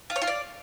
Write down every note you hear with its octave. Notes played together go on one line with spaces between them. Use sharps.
F4
C#5
F4
D5